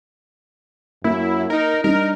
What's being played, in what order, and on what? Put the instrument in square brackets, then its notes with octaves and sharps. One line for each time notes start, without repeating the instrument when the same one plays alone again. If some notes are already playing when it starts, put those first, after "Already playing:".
[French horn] F#2 [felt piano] A#3 [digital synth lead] E4
[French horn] D#4 [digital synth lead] A#4
[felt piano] G3 D4 [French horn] D#4 [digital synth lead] A#4